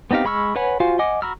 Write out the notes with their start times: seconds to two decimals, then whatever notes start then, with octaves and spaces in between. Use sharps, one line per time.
0.11 B3 C4 D#4 G4 F5
0.25 G#3 B5 C#6 E6 F6
0.56 B4 C#5 F#5 G#5 B5
0.80 F4 F#4 C5 F5 G#5
0.99 D#5 F#5 G#5 D6
1.22 F#4 A#5 B5 E6 F6